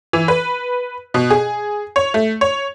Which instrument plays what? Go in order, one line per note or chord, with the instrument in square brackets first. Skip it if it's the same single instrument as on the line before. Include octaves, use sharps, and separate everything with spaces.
[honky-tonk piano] E3
B4
B2
G#4
C#5
A3
C#5